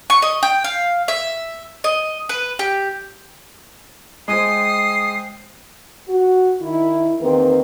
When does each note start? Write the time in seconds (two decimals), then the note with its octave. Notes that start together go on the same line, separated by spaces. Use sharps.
0.10 C#6
0.22 D#5
0.43 G5
0.64 F5
1.08 E5
1.84 D#5
2.29 B4
2.59 G4
4.28 G#3 C5 G5 G#5 D#6 C7
6.08 F#4
6.61 D#3 E4
7.21 E2 D#3 A#3 C4 B4